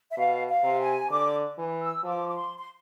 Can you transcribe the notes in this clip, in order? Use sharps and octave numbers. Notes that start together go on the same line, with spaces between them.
E5
B2 F5
F5
C3
G#5
D3 D6
E3
E6
F3 D6
D6
C6
C6